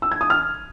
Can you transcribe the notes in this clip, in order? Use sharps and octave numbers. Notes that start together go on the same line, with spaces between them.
E6
G#6
D#6
F6